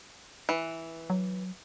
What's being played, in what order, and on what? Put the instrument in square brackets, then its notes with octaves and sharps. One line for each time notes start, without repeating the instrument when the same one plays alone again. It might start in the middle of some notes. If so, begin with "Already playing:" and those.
[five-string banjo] E3
[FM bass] F#3